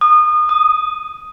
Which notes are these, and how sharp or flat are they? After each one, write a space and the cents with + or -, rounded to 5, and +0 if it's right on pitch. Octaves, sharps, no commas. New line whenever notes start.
D#6 -30
D#6 +5